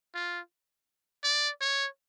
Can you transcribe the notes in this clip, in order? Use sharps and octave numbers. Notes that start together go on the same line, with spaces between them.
F4
D5
C#5